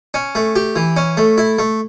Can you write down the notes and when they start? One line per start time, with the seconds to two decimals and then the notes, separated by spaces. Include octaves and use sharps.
0.14 C#4
0.35 A3
0.56 G4
0.76 E3
0.97 C#4
1.17 A3
1.38 E4
1.59 A3